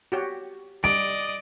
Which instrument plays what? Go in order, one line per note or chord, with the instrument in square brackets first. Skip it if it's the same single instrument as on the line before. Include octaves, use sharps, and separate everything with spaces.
[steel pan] F#4 G4 C#5
[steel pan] G3 [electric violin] D5 D#5 [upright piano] D7